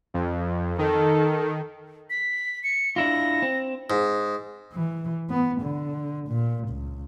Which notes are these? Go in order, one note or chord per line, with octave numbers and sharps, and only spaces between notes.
F2
D#3 A4
B6
C#7
D4 E4 F4 A#6
C4
G#2
E3
B3
D3
A#2
C#2